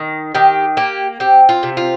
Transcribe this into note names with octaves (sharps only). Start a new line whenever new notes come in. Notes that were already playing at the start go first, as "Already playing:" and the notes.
Already playing: D#3
D#3 G4
A#3 G4
C4 G4
F4
C3
F4